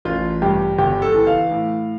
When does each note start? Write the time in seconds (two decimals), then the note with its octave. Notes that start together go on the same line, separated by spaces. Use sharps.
0.05 A1 F4
0.42 G2 G4
0.78 G1 G4
1.02 A4
1.14 E3
1.27 F5
1.51 A2